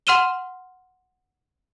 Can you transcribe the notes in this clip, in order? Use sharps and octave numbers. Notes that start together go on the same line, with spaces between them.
F#5 C6 F6 D#7 E7 G7